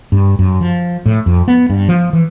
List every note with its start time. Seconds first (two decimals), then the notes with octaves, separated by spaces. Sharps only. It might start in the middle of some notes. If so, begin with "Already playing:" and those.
0.12 G2
0.39 F#2
0.61 F3
1.06 A2
1.26 F2
1.48 B3
1.70 G2
1.89 F3
2.13 E3